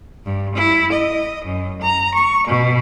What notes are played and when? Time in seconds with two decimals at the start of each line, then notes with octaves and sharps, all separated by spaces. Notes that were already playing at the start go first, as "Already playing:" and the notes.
0.24 G2
0.54 E4
0.91 D#5
1.43 F#2
1.80 A#5
2.12 C#6
2.46 B2